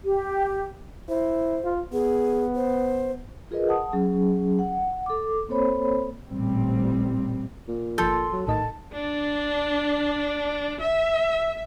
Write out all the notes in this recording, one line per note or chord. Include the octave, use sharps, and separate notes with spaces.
G4
E4 C5
F4
B3 G#4
C5
F4 G#4 A#4 B4 D#5
F#5 A5 D#6
F#3 C#4 G#4
F#5
A4 D6
A#3 C4 A4 C5 C#5 B5
A1 A#2 G3 C4
A#2
G1 F3 A4 C6 G6
F#3
A#1 A2 D#3 D#5 A5
D4
E5